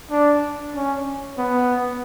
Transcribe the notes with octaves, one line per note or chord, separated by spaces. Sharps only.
D4
C#4
B3